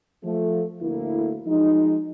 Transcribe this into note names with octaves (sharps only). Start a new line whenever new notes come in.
F3 A3
D2 A2 A#3 E4
F3 F#3 G#3 D#4